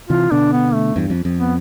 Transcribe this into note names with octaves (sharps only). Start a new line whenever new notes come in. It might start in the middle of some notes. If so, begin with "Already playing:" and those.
C3 E3 F4
B2 D3 D4
B3
A3
E2 G2
F2
F2
B3